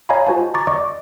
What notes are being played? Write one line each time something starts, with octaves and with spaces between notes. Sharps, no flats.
C#5 D#5 F5 G#5 A#5 B5
F4 F#4 C5 G#5 A5
A#5 C#6 D6 A6
D5 D#5 C#6 D6